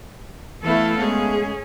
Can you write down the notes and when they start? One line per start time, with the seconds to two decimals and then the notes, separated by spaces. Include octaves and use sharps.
0.63 E3 A3 B3 E4 A4 F5
1.00 G#3 C#4 G#4